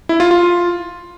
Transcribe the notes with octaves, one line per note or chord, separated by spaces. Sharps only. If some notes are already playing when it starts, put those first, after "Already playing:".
E4
F4
F4